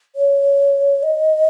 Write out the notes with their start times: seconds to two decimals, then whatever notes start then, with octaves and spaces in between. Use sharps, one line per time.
0.16 C#5
1.03 D#5